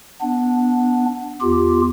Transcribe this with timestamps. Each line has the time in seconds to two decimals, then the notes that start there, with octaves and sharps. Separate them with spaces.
0.21 B3 D4
1.41 E2 F4 G4